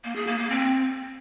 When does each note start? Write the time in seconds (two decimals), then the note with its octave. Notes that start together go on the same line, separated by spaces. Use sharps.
0.04 A#3
0.16 G#4
0.27 A#3
0.38 A#3
0.50 C4